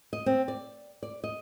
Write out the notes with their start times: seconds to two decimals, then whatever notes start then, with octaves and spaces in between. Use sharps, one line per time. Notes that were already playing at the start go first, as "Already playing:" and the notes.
0.13 D#5
0.26 C4
0.48 D5
1.03 D5
1.24 D#5